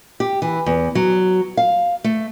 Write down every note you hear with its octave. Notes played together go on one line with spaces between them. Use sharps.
G4
E3
E2
F#3
F5
A3